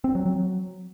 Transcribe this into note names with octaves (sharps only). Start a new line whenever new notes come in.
C4
F#3
F#3